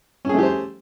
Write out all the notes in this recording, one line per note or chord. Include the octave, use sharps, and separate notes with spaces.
A3 C#4 G4 G#4 C5